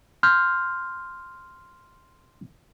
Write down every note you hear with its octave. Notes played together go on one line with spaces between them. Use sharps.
C6 F6 G6